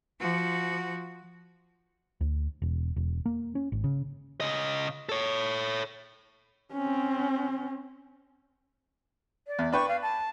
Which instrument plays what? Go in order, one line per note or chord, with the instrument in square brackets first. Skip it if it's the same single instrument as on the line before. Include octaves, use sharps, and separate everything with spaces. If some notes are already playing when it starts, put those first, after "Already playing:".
[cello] F3 F#4
[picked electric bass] D2
E1
E1
A#3
C#4
G#1
C#3
[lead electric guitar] C#3 D#5
A4 C#5
[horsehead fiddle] C4 C#4
[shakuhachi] D5
[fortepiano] E2
[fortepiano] D4 B4 G5 [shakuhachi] C#6
[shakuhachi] F5
A5